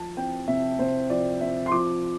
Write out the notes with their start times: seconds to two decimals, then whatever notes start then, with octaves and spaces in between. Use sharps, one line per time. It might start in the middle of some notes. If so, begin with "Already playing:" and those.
Already playing: F3 A5
0.17 C4 G5
0.48 C3 E5
0.79 C3 C5
1.10 F3 D5
1.41 C4 E5
1.66 C6
1.72 F3 D6